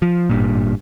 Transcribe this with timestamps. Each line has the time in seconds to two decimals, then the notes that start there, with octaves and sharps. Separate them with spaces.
0.02 F3
0.30 G#1 G2 A#2